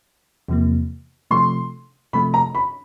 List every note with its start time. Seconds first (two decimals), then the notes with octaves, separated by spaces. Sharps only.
0.48 E2 C3 F3 A#3
1.31 C3 F3 A3 C6
2.13 C3 F3 A3 B5
2.34 A#5
2.55 B5